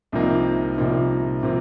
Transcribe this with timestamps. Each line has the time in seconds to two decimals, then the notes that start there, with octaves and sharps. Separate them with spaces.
0.12 C2 C3 F3 A#3 D#4
0.78 C2 C3 F3 A#3 D#4
1.43 C3 F3 A#3